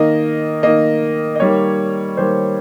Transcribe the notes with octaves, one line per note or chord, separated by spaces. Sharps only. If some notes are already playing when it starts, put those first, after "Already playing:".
Already playing: D#3 A#3 D#5
D#3 A#3 D#5
D#5
D#3 G3 A#3 C#5
D#3 G3 A#3 C5